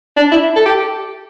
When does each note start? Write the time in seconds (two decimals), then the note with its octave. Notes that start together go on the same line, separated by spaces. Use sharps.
0.16 D4
0.32 E4
0.56 A4
0.66 G4